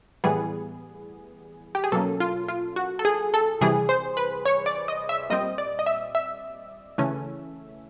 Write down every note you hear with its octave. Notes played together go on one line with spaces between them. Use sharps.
A2 E3 G3 B3 G#4
G4
G#4
B2 F#3 A#3 C#4 A4
F4
F4
F#4
A4
G#4
A4
C3 E3 G3 G#4
C5
B4
C#5
D5
D#5
E5
A#2 G3 C4 D#5
D5
D#5
E5
E5
C#3 E3 A3 C#4